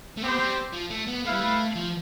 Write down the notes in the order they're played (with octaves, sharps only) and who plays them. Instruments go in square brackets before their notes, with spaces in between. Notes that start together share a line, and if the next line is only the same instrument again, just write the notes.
[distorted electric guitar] A3
[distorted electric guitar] B3 [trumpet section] C4 G4 C5
[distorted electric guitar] G3
F3
A3
B3
[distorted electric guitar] A3 [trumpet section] E4 B4 F5
[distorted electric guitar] G3
A3
F3